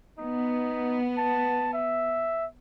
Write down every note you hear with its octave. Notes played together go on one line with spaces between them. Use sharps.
B3 D#4
A5
E5